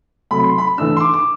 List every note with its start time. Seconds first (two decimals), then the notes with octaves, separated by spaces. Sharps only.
0.31 C3 F#3 A3 B5
0.44 C6
0.58 B5
0.78 E3 A3 D4 E6
0.97 C6
1.00 D6
1.14 D6